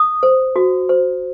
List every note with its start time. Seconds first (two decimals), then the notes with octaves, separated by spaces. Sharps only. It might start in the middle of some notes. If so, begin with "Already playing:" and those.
Already playing: D#6
0.23 C5
0.56 F#4
0.89 C5